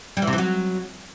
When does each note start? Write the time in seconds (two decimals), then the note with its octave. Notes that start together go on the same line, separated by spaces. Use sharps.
0.17 G3
0.22 E3
0.27 C3
0.33 E3
0.38 F#3